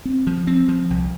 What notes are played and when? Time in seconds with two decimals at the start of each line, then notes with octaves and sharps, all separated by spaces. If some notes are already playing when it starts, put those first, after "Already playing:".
0.05 C4
0.27 F3
0.47 C4
0.68 F3
0.90 C2